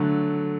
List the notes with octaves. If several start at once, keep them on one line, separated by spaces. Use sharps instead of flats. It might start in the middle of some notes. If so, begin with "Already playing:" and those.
Already playing: D3 F#3 A3